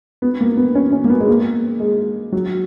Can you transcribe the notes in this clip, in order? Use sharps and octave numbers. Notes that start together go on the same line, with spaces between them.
B3
A#3
B3
C#4
C#4
A#3
B3
G#3
A#3
G#3
F#3